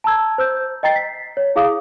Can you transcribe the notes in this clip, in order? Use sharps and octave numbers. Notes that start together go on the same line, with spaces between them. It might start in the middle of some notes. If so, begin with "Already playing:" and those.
A5 A#5 E6 G#6
C5 E6 G6
D#5 G5 A#5 A6 C7
B6
C#5
E4 G#4 F5 D6 D#6